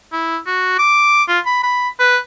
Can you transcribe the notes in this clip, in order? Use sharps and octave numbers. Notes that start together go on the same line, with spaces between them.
E4
F#4
D6
F4
B5
B5
B4